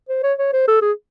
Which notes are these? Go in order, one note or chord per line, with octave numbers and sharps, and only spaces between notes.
C5
C#5
C#5
C5
A4
G#4